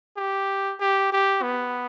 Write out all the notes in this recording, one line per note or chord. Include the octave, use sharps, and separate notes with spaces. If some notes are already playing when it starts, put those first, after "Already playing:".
G4
G4
G4
B3